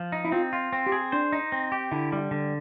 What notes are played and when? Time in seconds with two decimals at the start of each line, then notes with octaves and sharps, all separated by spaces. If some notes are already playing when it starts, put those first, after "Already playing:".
Already playing: F3
0.12 D#4
0.25 E4
0.32 C4 F4
0.53 F4
0.73 C4
0.86 G4
0.92 G#4
1.12 D4 C5
1.32 D#4
1.52 C4
1.72 G4
1.91 D3 E4
2.12 G3
2.31 D3